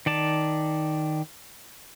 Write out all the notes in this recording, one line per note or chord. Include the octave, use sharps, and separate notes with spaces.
D#3 D5 A5